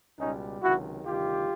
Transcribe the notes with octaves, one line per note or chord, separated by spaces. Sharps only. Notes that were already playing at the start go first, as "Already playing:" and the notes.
C#2 B2 G3 C#4 D#4
C#2 C3 D#3 F#3 E4 F#4
D2 C3 D#3 G3 F4 G4